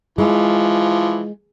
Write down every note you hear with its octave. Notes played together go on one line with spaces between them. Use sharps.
E3 F3 G#3